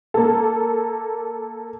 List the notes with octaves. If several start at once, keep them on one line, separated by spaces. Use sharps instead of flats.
A#3 A4